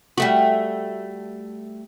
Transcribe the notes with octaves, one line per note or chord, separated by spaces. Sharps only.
G3 A3 F#4